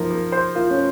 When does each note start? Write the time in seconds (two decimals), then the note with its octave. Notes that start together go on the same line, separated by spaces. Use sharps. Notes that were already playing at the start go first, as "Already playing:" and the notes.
Already playing: F3 A#3 D#4
0.11 A#3
0.32 C5
0.55 A#3 F4
0.70 C#4